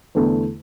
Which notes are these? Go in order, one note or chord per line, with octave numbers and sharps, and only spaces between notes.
E2 D3 A3 E4